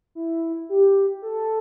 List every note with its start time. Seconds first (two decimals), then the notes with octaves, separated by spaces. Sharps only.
0.15 E4
0.69 G4
1.22 A4